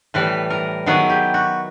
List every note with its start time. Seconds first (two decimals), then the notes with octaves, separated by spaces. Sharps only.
0.14 A2 E3 G3 B4
0.50 A#4
0.86 D#3 F#3 B3 E4 G#4
1.10 G4
1.34 F#4